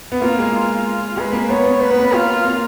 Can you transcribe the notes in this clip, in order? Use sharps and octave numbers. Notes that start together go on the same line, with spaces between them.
B3
A#3 F4
G#3
F4
G#3 B4
A#3
B3 C#5
B3
A#3 B4
B3
A#3
F4
A#3